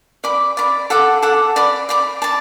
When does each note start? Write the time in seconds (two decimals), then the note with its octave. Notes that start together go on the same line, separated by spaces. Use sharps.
0.24 D5 B5 D6
0.57 D5 B5 D6
0.90 A4 F#5 D6
1.22 A4 F#5 D6
1.56 D5 B5 D6
1.89 D5 B5 D6
2.22 D5 A5